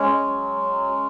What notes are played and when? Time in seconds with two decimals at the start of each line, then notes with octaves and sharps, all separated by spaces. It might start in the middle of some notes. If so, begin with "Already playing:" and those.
Already playing: G#3 C#4
0.24 F#3
0.56 F#3